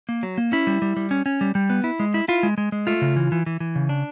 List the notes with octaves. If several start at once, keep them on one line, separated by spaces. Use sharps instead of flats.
A#3
F#3
A#3
C#4 E4
G3
G3
G3
C#4
C#4
G3
G3
B3
E4
G#3
E4
E4 F4
G#3
G#3
G#3
A3 F4
C#3
E3
E3
E3
E3
C#3
D4